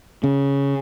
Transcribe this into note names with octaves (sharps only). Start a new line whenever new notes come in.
C#3